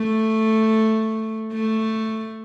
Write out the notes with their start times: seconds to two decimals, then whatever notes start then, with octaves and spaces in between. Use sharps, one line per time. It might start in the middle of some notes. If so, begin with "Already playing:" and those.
Already playing: A3
1.52 A3